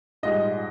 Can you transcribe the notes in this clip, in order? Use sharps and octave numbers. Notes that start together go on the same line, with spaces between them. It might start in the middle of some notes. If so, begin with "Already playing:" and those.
A#1 G#2 G3 D#5